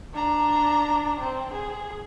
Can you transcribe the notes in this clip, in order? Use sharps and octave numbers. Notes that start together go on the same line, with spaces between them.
D4 A#5
C4
G#4